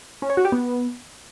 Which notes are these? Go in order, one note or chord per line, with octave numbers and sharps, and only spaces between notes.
C#4
C#5
F#4
G4
B3